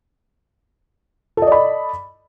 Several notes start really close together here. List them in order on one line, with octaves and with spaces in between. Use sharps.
A4 D#5 D5 B5